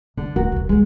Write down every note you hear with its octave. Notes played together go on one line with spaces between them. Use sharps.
G1 D3
D1 E2 F#4 A#4
D#1 D#2
D#2 D3 G#3